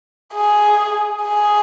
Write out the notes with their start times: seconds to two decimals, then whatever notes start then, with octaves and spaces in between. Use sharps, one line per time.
0.34 G#4
1.23 G#4